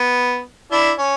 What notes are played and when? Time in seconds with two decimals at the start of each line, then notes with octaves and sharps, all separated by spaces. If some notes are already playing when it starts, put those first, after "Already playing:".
Already playing: B3
0.72 D4 E4
0.98 C#4